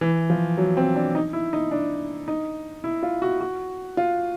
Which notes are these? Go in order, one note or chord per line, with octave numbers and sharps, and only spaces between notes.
E3
F3
F#3
C4
D4
D#4
E4
D#4
D4
D#4
E4
F4
F#4
F#4
F4